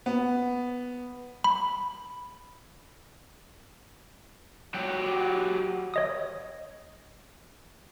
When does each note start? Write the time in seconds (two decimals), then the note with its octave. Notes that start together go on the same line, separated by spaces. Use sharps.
0.06 B3
1.44 B5
4.74 F#3 G4
5.94 C#5 D#5 D#6